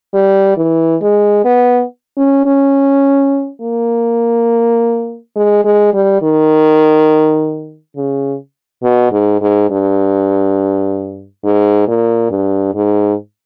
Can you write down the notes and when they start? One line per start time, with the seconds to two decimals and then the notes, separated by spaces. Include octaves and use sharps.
0.14 G3
0.57 E3
1.02 G#3
1.44 B3
2.17 C#4
2.46 C#4
3.61 A#3
5.36 G#3
5.65 G#3
5.93 G3
6.22 D#3
7.96 C#3
8.83 B2
9.12 G#2
9.41 G#2
9.70 G2
11.44 G#2
11.88 A#2
12.31 G2
12.75 G#2